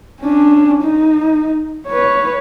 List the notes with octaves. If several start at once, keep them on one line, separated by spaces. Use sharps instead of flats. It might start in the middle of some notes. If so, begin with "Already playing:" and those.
C#4 D4
D#4
B4 C#5